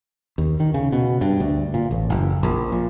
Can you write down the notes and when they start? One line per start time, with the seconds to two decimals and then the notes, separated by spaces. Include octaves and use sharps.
0.38 D#2
0.60 D#3
0.74 C#3
0.92 B2
1.21 G2
1.40 D2
1.74 A#2
1.91 A1
2.10 F#1
2.43 A#1
2.72 A#2